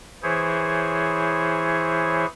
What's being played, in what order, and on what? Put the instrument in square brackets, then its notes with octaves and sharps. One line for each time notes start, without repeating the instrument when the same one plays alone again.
[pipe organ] E3 E4 G#4 C5 C#5